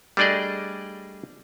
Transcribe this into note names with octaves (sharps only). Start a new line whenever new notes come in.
G3 A3 D4 G#4 D5 D#5